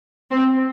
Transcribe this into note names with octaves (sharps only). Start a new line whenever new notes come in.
C4